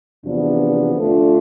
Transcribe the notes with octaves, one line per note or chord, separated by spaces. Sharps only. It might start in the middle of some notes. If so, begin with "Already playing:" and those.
E2 C3 F3 B3 D4
D3 A3 D4 F4